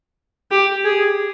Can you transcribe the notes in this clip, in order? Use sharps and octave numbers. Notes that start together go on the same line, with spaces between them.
G4
G#4